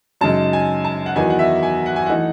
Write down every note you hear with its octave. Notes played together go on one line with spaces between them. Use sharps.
F#2 C#3 G#3 D#4 A5
G#5
A5
F#5
E2 D#3 F#3 B3 D#4 G#5
F#5
E5
G#5
F#5
G#5
E3 A3 D#4 F#5